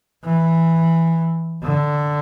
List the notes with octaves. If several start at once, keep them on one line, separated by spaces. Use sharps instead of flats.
E3
D3